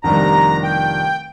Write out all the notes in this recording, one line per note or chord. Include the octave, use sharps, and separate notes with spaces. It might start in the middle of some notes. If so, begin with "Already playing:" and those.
F1 F2 D#3 G3 D4 A#5
G5